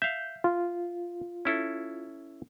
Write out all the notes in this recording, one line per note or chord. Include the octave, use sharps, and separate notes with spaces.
E5 F5 G6
F4
C#4 E4 A4